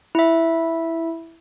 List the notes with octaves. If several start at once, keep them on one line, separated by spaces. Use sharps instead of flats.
E4 E5